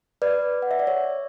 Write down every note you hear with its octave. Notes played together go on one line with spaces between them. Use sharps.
B4 D5
F#5
E5
D5
C#5 E5